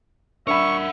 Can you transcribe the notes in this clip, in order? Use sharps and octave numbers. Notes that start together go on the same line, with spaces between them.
D4 A#4 E5 F#5 B5 C#6